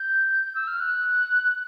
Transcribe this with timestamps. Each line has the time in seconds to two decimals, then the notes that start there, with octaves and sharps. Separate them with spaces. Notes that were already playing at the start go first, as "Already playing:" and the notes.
Already playing: G6
0.55 E6
0.67 F6
0.80 F#6